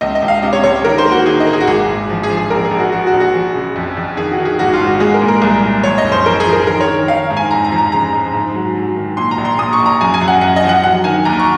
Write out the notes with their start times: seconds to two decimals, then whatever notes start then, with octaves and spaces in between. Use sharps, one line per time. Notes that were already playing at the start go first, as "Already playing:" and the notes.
0.01 C#2 D#5
0.15 D#5
0.22 C#2
0.28 F5
0.42 C3 D#5
0.53 C#5
0.63 C#2 C#5
0.84 D#3 A#4
0.98 C5
1.05 A#3
1.12 F#4
1.26 D#3 G#4
1.40 D#5
1.47 A#3
1.53 G#4
1.61 F#4
1.67 G#1 G#4
1.89 G#1
2.10 F3
2.23 G#4
2.29 F3
2.37 G#4
2.50 A#1 A#4
2.65 G#4
2.71 A#1
2.78 F#4
2.92 F3 F#4
3.07 F#4
3.14 A#1
3.20 F#4
3.34 F3
3.55 C#3
3.76 F2
3.97 F2
4.17 D#3 G#4
4.31 F#4
4.38 D#3
4.45 G#4
4.59 G#1 F#4
4.73 F4
4.79 G#1
4.86 F#4
5.00 G#3 G#4
5.14 A#4
5.21 A#2
5.28 A#4
5.42 C2
5.63 A#2
5.84 F3 C#5
5.98 D#5
6.04 F#1
6.12 C5
6.25 F3 A#4
6.40 G#4
6.46 F3
6.53 A#4
6.67 D#3 A#4
6.81 C#5
6.88 D#3
7.08 D#4 F5
7.30 G#2
7.37 G#5
7.51 F2 A#5
7.64 A#5
7.72 F3
7.78 A#5
7.92 C#3 A#5
8.13 G#3
8.34 G#2
8.54 F#3
8.76 F#3
8.96 D#3
9.17 A#2 C6
9.31 A#5
9.38 A#1
9.45 C6
9.59 A#2 D#6
9.73 C#6
9.80 A#1
9.86 A#5
10.00 F#2 G#5
10.14 G#5
10.21 F#2
10.28 F#5
10.41 F#2 F#5
10.56 D#5
10.63 F3
10.69 F#5
10.83 F#3 F#5
11.04 D#3 G#5
11.25 D#2 A#5
11.39 C#6